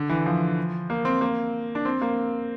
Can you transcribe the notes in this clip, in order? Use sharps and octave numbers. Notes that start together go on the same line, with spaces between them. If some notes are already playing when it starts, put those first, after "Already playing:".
Already playing: D3
E3
F3
A#3
C4
A#3
D4
C4
A#3